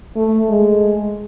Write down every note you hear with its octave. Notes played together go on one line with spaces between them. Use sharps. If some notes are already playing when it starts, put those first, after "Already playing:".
A3
G#3